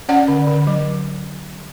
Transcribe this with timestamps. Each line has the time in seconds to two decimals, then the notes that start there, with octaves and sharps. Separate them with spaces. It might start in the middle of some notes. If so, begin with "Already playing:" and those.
0.09 C#4 D5 F#5
0.28 D3
0.47 D3
0.67 F#3